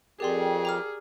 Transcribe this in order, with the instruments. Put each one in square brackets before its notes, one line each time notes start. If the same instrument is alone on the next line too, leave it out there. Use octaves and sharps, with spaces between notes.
[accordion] F2 [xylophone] G4 D5 C6 [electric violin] G#4 [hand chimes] A#4 G5
[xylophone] A#5 D6 F6